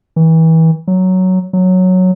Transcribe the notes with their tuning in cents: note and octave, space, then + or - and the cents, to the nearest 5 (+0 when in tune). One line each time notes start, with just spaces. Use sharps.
E3 -30
F#3 +5
F#3 -5